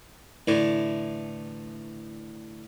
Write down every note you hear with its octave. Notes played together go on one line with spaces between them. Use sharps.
A2 D3 E3